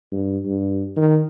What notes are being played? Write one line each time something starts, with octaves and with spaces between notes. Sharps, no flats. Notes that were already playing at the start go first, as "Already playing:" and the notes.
G2
G2
D#3